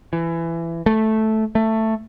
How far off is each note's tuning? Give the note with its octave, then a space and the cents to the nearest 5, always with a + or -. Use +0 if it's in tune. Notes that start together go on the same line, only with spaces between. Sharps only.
E3 +20
A3 -5
A3 +10